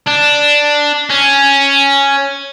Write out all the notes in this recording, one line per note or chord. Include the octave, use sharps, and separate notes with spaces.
D4
C#4